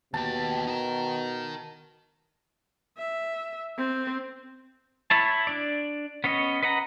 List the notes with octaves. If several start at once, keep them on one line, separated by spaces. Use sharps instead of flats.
D#2 B2 G4 A5
D#4 A#4
E5
C4
E4 C#5 A5
D4 D5
B3 C#4 C#5 D#5
B4 D#5 F#5 A#5